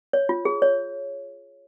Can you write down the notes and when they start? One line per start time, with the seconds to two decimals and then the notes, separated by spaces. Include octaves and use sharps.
0.13 C#5
0.29 F4
0.45 G#4
0.62 C#5